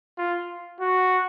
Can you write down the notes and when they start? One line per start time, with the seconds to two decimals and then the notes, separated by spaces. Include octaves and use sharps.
0.18 F4
0.81 F#4